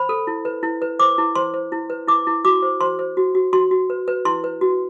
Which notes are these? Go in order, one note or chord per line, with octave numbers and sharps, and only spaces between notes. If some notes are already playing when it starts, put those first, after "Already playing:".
Already playing: C5 B5
A4
E4
B4
E4
B4
C5 D6
E4
C5 C6
C5
E4
B4
E4 D6
E4
F#4 D6
C5
C5 C6
C5
F#4
F#4
F#4 C6
F#4
B4
B4
E4 C6
B4
F#4